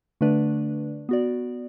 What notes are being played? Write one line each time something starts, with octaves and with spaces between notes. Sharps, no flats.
D3 A3 D4 B4 D5
B3 F#4 D5